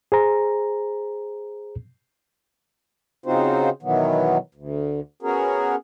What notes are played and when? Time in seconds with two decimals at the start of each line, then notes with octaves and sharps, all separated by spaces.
0.12 G#4 C5 A#5
3.26 C#3 C4 D#4 F4 F#4 C5
3.82 B2 D#3 E3 F#3 B3
4.55 D2
5.22 B3 C#4 F#4 G#4 A#4